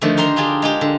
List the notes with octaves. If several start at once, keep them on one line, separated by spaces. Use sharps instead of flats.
D3 D#3 F3 A3
G4 A#4 C5 A#5 C6
D4 F4 G4 G#4 D5
G#3 F4 G4
D3